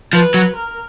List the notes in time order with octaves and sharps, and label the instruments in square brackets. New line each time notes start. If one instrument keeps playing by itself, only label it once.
[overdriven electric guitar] F3 [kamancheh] B4
[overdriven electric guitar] F#3
[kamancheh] A#4